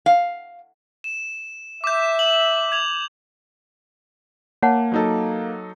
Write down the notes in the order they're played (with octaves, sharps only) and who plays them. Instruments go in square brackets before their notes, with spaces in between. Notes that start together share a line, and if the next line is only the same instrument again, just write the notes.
[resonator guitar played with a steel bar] F5
[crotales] E7
[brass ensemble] E5 [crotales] D6 G6
[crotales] F#7
G#6 F7 F#7
[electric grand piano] A#3 [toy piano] C#5 F#5 A5
[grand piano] F#3 D#4 A4